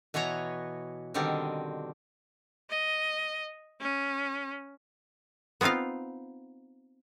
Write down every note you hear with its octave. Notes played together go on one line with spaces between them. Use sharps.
B2 E3 B3 C#5 A#5
B2 D3 D#3 G3 C4
D#5
C#4
B3 C4 D#4 F4 F5